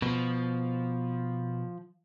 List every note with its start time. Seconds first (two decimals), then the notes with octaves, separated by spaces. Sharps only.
0.02 B2 F3